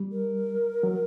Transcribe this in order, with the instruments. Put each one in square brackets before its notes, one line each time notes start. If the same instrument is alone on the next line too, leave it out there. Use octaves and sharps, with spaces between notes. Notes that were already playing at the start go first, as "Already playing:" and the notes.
Already playing: [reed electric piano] G3
[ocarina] A#4
[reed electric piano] F#3